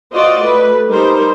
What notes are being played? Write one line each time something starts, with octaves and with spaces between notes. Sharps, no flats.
F4 F#4 C5 D5 D#5
A3 B4
G3 D#4 A#4 C5